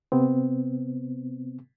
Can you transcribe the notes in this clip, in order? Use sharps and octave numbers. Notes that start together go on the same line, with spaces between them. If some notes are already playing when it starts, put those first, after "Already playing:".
C3 B3 C4